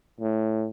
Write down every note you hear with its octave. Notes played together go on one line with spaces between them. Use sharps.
A2